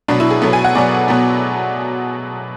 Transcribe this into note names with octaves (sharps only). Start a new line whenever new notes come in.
B2 F#3 B3 D4
E4
G#4
B2 F#3 B3 A4
G#5
F#5
B2 F#3 B3 D5
B2 F#3 B3